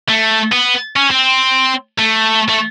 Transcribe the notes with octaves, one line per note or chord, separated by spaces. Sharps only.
A3
B3
C#4
C4
A3
A3